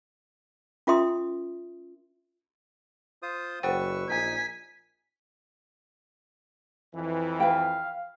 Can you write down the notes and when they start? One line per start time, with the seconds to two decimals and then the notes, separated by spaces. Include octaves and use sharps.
0.87 C#4 F4 A#4 E5 C6 D#6
3.22 F4 C5 D#6
3.63 F#1 B4 C5 F#5 G5 C#6 E6
4.09 A#1 D#4 G#5 B6
6.94 F2 E3
7.40 B4 F5 G5